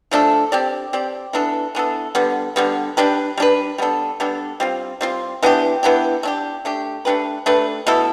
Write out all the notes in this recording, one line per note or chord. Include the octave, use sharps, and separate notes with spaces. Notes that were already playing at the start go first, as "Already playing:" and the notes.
F3 A3 D4 A4
C4 G4 D5
C4 G4 D5
E3 B3 D4 A4
E3 B3 D4 A4
D3 G3 B3
D3 G3 B3
G3 D4 G4 B4
G3 D4 G4 B4
G3 B3 D4 A4
G3 B3 D4 A4
G3 C4 F4
G3 C4 F4
E3 B3 D4 G4
E3 B3 D4 G4
A3 D4 G4
A3 D4 G4
A3 D4 G4 B4
A3 D4 G4 B4
B2 A3 E4 A4